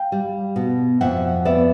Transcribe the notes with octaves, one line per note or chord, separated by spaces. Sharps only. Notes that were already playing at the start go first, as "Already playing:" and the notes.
Already playing: F5 G5
G3
B2
F2 E5 F#5
B3 D5 E5